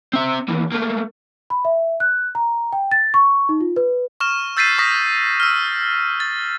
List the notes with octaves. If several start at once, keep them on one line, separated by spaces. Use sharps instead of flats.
C4 E5
D#2 E3
A3 A#3
B5
E5
F#6
A#5
G5
A6
C#6
D#4
F4
B4
C#6 F6 E7
E6 G6 A6 B6 C7 D#7
C#6 D#6 A#6 B6
E6 F6
A6